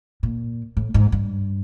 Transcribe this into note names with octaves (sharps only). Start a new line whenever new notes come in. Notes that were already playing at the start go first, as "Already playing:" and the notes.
A#2
A2
G#2
G2